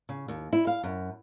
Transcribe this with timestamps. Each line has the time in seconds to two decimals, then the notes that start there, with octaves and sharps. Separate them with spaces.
0.09 C#3
0.28 D#2
0.53 E4
0.67 F5
0.84 F#2